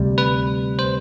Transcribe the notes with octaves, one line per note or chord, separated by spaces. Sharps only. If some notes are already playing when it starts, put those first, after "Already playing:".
Already playing: D2 C3 G3
B4
C5